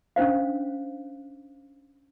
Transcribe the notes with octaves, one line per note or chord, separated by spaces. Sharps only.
C#4 D4 C5 F5